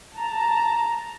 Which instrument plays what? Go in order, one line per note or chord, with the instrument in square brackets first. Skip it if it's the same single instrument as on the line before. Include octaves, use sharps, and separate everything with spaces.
[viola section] A5 A#5